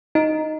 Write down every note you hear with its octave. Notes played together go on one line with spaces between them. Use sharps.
D#4